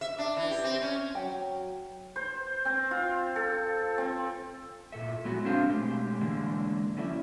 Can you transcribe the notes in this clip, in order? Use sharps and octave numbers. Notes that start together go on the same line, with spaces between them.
E5
D4
E3
G4
C4
C#4
F#3 G5
C5
C4
F4
A4
C4
A#2 A4 E5
F#3 G#3 B3 F#4
C4 D4 A4 F5
B2 G#3 A3 G4
D3 E3 G#3 A#3 D4
F#3 C#4 E4 A4 D5 E5